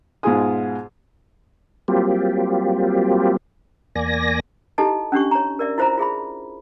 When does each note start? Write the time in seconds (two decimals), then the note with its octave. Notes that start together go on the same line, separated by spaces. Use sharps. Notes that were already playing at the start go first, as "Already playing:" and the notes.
0.23 G#2 B2 F4 G#4 G#5 D#6
1.88 F#3 G3 A#3 C4 F4 G4
3.95 E2 A#3 D5 G#5 A#6
4.78 D#4 E4 G4 A4 D#5 A5
5.12 C#4 D4 G4 C#6
5.31 C#5 A#5
5.59 A#4 D5 E5
5.78 E4 F4 C5 E5 A#5
5.98 F4 G#4 E5 B5